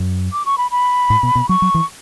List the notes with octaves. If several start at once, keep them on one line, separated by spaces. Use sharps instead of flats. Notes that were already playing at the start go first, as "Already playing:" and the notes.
Already playing: F#2
D6
C#6
B5
B5
A2
B2
B2
F#3 C#6
F#3
E3